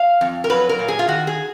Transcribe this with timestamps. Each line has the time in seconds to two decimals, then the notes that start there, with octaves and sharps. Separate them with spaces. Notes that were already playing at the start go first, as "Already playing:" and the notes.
Already playing: F5
0.21 F2
0.44 A#4
0.50 F#3 B4
0.69 A#4
0.79 A#2
0.88 G#4
0.99 F4
1.08 D#3 F#4
1.27 G#4